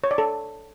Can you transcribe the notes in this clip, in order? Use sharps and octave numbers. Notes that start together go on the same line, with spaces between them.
C#5
D5
A4